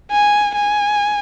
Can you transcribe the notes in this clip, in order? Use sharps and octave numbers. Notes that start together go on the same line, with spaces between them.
G#5
G#5